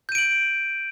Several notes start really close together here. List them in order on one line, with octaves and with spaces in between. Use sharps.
G6 D#7 D7 F#7